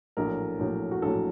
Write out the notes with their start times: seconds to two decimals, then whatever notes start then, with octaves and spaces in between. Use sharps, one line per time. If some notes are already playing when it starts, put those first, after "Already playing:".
0.17 A#1 A2 F#3 A#4
0.59 A#1 A2 F#3
0.91 F#4
1.02 A#1 A2 F#3 A4